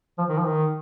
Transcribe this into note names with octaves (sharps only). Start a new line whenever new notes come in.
F3
D#3
F3
D#3